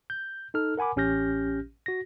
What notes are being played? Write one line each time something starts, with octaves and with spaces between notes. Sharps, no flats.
G6
D#4 A4 F6
A#4 F#5 G#5 B5 D6
A1 C#4 G4 F6 G6 A#6
F#4 A#6